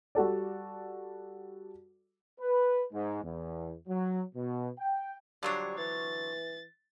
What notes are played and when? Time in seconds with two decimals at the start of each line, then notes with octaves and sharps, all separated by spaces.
0.15 G3 F#4 A4 D5
2.40 B4
2.92 G#2
3.22 E2
3.88 F#3
4.35 B2
4.79 G5
5.43 D3 F#3 G3 D4 F4 C5 C#5
5.78 E3 A6